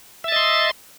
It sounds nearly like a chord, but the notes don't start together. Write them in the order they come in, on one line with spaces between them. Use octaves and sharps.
E5 A6 D#5 C6